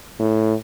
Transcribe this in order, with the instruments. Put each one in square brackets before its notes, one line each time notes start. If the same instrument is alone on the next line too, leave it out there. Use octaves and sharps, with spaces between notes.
[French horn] A2